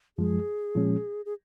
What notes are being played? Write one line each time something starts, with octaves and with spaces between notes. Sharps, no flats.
F#2 F3 G#3 G#4
A#2 F3 G#3 C#4
G#4